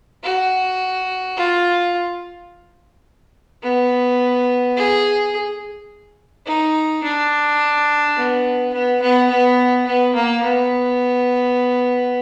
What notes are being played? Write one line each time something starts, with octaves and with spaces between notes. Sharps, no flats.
F#4
F4
B3
G#4
D#4
D4
B3
B3
B3
B3
B3
A#3
B3